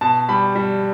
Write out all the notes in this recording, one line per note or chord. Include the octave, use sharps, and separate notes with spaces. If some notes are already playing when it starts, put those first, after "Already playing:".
B2 A5
G3 B5
G3